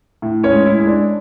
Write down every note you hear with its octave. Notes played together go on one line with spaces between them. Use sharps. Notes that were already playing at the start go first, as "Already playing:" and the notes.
A2
C#4 C#5
G#3
E4
G#3
D4